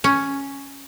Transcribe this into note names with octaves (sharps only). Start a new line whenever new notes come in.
C#4